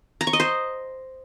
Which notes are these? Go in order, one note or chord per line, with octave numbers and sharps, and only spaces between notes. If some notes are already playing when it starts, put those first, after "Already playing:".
A#5
C#6
D#5
C5